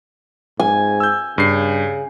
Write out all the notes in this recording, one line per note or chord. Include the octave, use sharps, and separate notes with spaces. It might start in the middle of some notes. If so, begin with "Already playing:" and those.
G#2 G#5
E6 G6
G2 C#3 C7